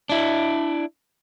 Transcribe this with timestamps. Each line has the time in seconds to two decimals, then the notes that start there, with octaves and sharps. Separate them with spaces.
0.09 D4 E4